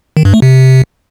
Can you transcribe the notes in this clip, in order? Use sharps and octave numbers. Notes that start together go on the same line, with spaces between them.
D#3
G2
A3
C3